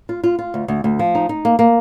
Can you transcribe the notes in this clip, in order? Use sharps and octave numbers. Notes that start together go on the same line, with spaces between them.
F4
F4
F4
D2
D2
D2
F3
D#4
D#4
A#3
A#3